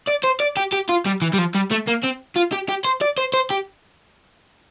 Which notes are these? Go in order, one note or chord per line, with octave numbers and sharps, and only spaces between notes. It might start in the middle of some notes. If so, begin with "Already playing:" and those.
D5
C5
D5
G4
G4
F4
G3
E3
G3
F3
G3
A3
A#3
C4
F4
G4
G4
C5
D5
C5
C5
G4